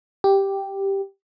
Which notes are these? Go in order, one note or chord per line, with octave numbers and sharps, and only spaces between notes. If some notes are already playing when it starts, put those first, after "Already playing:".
G4